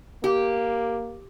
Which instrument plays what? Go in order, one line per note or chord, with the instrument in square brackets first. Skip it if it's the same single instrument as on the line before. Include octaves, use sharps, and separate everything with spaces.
[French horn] A#3 [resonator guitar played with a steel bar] G4